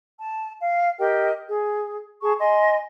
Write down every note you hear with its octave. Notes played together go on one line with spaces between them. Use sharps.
A5
F5
G4 A#4 D#5 G5
G#4
G#4 A5 C#6
D#5 G#5 C6